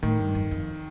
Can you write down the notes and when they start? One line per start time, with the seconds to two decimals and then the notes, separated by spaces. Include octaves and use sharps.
0.03 A2 D#3
0.19 G2
0.35 F2
0.51 F2